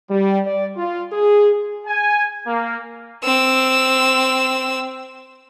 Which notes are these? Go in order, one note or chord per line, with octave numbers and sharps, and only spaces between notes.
G3
D5
F4
G#4
G#5
A#3
C4 E6